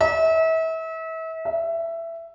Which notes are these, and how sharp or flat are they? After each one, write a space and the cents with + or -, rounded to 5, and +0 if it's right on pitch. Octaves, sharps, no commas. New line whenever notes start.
E5 -35
E5 +15